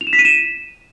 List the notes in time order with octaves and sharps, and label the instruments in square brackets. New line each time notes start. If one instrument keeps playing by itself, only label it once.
[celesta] F7
E7
B6
D#7
E7